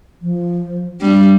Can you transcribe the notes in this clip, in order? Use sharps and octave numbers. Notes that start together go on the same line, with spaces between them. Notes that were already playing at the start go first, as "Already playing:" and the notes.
F3
G3 D4